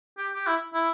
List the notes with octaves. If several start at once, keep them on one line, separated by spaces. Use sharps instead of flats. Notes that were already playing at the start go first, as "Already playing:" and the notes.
G4
G4
E4
E4